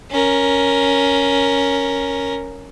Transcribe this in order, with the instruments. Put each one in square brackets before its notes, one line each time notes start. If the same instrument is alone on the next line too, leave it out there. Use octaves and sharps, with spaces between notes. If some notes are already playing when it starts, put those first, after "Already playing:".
[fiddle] C#4 A#4